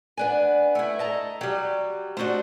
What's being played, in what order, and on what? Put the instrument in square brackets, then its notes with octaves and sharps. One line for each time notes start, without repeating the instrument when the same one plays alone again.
[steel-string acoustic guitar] B3 D4 G#5
[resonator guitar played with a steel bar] A3 E4
[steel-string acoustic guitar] D#5 A5 A#5
[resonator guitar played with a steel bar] F#3 G3 [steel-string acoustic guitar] G4
[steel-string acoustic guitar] A3 D#4 [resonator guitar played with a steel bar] D4 F#4 C5